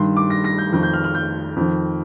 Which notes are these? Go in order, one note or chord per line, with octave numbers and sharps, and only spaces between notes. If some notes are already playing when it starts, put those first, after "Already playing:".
Already playing: G2 D#3 C6
D6
A#6
A#6
G6
F2 D#3 G6
G6
F6
F6
G6
F2 D#3